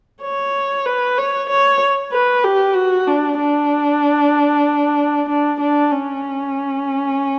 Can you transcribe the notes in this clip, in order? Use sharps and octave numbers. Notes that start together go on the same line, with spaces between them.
C#5
B4
C#5
C#5
B4
G4
F#4
D4
D4
D4
D4
C#4